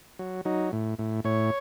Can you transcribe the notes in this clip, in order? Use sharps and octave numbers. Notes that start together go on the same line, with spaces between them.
F#3
F#3 D#4
A2
A2
A2 C#5